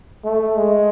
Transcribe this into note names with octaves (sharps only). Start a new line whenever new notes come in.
A3
G#3